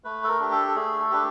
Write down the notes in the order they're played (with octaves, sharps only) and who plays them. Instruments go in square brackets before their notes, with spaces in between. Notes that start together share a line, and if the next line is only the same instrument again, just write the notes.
[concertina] A3 B4
A4
A#4
D4 G4
A4
A4
A3 G#4
A4
D4 G4 B4